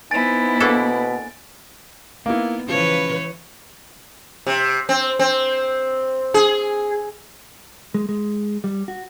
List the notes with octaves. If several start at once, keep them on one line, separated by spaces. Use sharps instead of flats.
B3 C4 D#4 E4 G#5 A6 D7
B2 A#3 D4 A4
A#3 B3 D#4 E4
C#3 E3 F3 B4 C#5
C3
C4
C4
G#4
G#3
G#3
G3
F#4